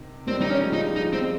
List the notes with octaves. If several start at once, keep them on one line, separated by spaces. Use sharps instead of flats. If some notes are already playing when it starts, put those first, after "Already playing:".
Already playing: C3 D#3
D#3 G3 C4
D#4
C#4
F3 G#3
D#4
F3 G#3 D#4
C4